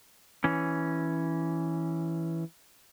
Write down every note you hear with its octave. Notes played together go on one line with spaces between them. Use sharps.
E3 C#4